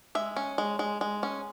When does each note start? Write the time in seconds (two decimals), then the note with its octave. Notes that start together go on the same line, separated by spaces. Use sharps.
0.15 G#3 E5
0.37 C#4
0.58 G#3
0.79 G#3
1.01 G#3
1.23 C#4